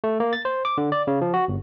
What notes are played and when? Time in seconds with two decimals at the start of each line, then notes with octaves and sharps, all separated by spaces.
0.04 A3
0.20 A#3
0.33 A6
0.45 C5
0.65 D6
0.78 D3
0.92 D5
1.07 C#3
1.21 F3
1.34 F#4
1.48 G1